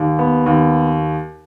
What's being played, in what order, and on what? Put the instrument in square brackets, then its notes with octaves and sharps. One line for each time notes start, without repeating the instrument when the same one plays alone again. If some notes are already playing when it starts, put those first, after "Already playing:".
Already playing: [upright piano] D#2
B3
D#2